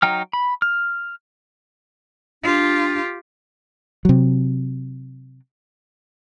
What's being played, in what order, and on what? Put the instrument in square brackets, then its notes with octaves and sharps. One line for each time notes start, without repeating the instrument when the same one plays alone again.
[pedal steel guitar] F#3 D#4 G5 F6
B5
F6
[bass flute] D4 [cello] F4 G4
[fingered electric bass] C3 F#3